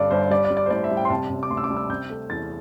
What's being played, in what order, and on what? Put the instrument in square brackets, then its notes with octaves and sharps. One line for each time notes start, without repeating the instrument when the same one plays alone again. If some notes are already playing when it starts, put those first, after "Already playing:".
Already playing: [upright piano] G1 G2 D3 G3 D5
G1 C5
G3 D5
D5
G3
D5
C5
A2 D5
E5
G3
G5
C6
C3 A5
C3
D6
D2 C6
E6
D6
G3
E6
C3 G6
A3
E2 A6